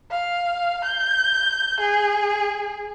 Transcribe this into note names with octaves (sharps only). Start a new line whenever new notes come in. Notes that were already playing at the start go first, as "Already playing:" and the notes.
F5
G6
G#4